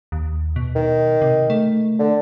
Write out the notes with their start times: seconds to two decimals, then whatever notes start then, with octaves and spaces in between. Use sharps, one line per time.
0.12 D#2
0.56 B2
0.75 D#3
1.22 C3
1.50 A3
1.99 D3